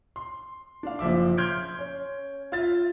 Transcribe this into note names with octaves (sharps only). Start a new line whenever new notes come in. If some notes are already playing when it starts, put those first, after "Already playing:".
C6
D4 F5
F#1 F3 E5 D6
C6 F6 G6 G#6 D7
C#4
F4 E5 F5 A6